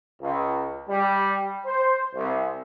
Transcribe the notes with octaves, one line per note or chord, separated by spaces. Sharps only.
C#2
G3
C5
C2